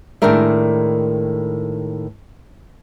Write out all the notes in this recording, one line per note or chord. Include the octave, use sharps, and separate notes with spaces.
A2 D#3 G#3 D4 A#4 E5